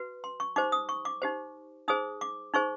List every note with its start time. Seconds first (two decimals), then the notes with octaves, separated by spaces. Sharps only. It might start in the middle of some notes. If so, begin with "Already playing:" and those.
Already playing: F#4 B4
0.24 C6
0.40 C#6
0.56 D#4 G4 C5 D6
0.72 D#6
0.89 C#6
1.05 D6
1.22 D#4 G4 C5
1.88 D#4 G#4 C5 D#6
2.21 D6
2.54 D#4 G#4 C5 C#6